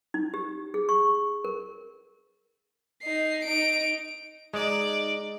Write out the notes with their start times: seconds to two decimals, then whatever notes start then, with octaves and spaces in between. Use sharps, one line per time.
0.14 D#4
0.34 G4
0.74 G#4
0.89 C#6
1.45 A#4
3.02 D#4 C7
3.44 D#4 D7
4.54 G#3 D#4 D5